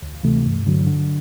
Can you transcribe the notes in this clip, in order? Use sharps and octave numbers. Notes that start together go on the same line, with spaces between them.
D2
C3 E3 A3
G2
D3 F#3
D3